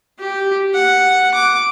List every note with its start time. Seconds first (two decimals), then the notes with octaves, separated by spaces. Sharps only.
0.19 G4
0.74 F#5
1.34 D6